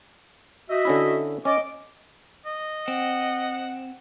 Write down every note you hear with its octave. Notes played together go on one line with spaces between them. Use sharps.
F#4 D#5 E5
D3 C#4 E4
C#4 D#5 D6
D#5
C4 F#5